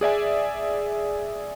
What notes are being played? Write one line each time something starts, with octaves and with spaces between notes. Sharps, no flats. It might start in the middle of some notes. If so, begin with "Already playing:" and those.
G#4 D5 E5 G#5